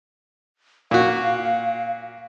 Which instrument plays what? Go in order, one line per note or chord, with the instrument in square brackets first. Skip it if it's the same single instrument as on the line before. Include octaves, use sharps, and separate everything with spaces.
[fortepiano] A#2 F#4 [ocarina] F5